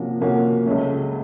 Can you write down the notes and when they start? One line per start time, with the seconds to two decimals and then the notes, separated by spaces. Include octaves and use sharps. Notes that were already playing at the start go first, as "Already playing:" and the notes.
Already playing: C3 F3 A#3 C#4 F#4
0.20 C3 F3 A#3 C#4 F#4
0.66 C#2 C#3 F#3 A3